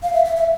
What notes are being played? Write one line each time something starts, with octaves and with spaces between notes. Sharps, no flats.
F5
E5
E5
E5